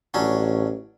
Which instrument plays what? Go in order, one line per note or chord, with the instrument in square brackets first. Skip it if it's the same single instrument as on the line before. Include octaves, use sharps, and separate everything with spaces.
[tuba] A1 [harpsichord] F#3 C#4 D4